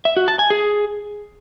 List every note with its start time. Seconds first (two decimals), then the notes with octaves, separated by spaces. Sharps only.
0.05 E5
0.17 F#4
0.28 A5
0.39 G#5
0.50 G#4